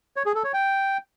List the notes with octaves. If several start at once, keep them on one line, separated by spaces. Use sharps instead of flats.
C#5
G#4
A4
C#5
G5